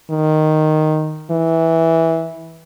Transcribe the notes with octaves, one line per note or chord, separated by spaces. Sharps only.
D#3
E3